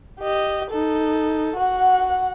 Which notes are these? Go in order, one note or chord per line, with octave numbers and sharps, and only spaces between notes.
G4 D#5
D#4 A4
F#4 F#5